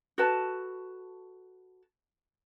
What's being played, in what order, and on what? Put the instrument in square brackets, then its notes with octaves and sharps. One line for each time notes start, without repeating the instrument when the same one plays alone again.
[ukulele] F#4 A4 B4 A5